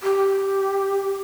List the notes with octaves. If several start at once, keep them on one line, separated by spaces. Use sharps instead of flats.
G4